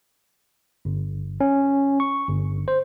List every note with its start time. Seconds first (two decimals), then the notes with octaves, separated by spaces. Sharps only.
0.85 G1
1.41 C#4
2.00 C#6
2.28 G1
2.68 C5